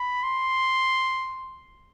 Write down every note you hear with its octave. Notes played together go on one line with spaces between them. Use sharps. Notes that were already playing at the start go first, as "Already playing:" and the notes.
Already playing: B5
C6